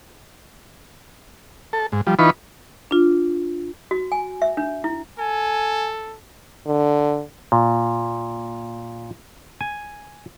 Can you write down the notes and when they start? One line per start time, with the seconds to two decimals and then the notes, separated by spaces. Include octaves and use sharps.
1.73 A4
1.92 G#2
2.07 F3 G3
2.19 E3 D#4 F4 B4 B5 C#6
2.91 D4 F4
3.91 F#4
4.12 G#5
4.42 E5
4.57 D4
4.84 E4
5.18 A4 G#5
6.66 D3
7.52 A#2
9.61 G#5